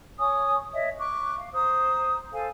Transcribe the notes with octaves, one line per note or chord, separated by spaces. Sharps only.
C#5 G#5 C#6 D#6
C#5 D#5 E5
C#6 D6 F#6
F5
C5 A#5 D#6
A4 C5 F5 G#5